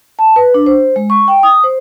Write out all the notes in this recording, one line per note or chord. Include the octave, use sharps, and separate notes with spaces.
A5
B4
D4
C5
G#3
C#6
G5
D#6
C5